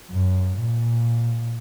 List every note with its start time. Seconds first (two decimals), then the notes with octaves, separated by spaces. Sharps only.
0.11 F#2
0.58 A#2